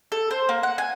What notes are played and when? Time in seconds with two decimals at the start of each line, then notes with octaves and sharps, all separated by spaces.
0.12 A4
0.31 C5
0.49 A#3
0.63 F#5
0.78 G#5